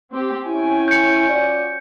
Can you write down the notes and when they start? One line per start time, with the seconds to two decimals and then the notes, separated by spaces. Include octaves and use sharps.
0.10 C4 G4
0.46 C#4 E4 G5 G#5
0.88 G6 C#7
1.28 F4 F#4 D5